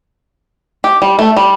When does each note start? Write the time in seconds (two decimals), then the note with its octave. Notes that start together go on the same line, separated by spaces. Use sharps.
0.84 G4
1.02 G3
1.19 A3
1.36 G3